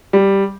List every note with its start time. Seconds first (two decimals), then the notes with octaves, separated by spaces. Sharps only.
0.13 G3